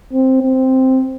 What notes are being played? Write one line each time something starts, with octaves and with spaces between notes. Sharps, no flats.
C4
C4